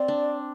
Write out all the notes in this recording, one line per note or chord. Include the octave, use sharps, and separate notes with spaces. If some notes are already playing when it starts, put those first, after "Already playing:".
Already playing: C4 D5
D4